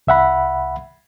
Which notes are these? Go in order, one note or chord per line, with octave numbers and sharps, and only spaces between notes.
C2 E5 F#5 B5